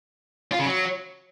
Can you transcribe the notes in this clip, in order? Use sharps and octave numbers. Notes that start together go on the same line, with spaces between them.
F4
C#3
F#3